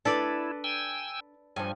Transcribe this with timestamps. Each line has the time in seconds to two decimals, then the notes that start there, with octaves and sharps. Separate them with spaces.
0.05 D4 E4 A4 B4 D5
0.64 G5 G#5 E6
1.56 G2 F3 G#5